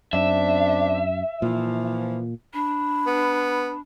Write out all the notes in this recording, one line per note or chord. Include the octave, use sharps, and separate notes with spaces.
F#2 C4 D4 E5
A#2 E3 F3
D4 B5
B3